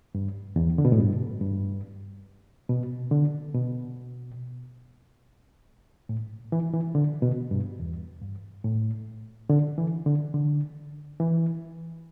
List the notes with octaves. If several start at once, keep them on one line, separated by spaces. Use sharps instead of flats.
G2
E2
D3
B2
A2
G2
G2
B2
D3
B2
A2
E3
E3
D3
B2
G2
E2
G2
A2
D3
E3
D3
D3
E3